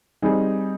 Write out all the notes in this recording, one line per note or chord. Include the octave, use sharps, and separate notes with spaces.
G3 C4 D#4 G#4